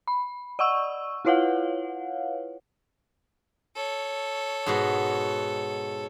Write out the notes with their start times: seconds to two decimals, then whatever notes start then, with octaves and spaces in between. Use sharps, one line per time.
0.08 B5
0.59 D5 D#5 F#5 C#6 E6
1.25 E4 F4 B4 C#5 F5 F#5
3.76 A4 C#5
4.66 G#2 B2 F#4